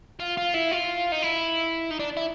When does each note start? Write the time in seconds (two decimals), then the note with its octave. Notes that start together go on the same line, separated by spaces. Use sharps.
0.20 F4
0.37 F4
0.54 E4
0.71 F4
1.12 D#4
1.23 E4
1.91 D#4
2.00 D4
2.17 E4